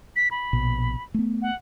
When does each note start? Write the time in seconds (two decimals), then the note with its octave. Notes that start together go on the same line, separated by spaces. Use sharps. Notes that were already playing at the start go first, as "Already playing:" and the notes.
0.16 B6
0.31 B5
0.53 A#1 B2
1.14 A3 B3
1.42 F#5